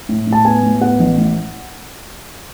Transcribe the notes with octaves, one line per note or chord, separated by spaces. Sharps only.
A2
A2
A5
B3 G#5
A2
B3 F#5
A1
A2